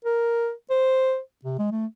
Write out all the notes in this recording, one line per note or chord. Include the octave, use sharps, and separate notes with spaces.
A#4
C5
C3
G#3
A3